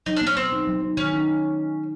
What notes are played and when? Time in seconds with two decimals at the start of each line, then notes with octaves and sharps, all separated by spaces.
0.06 F#3 D#4
0.17 D4
0.22 B3
0.27 C#4
0.37 B3 C4
0.52 D#4
0.67 F#3
0.82 D#4
0.97 D#3 C#4
1.13 D#4